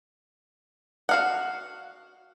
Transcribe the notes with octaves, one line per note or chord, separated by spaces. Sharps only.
F#4 F5 F#5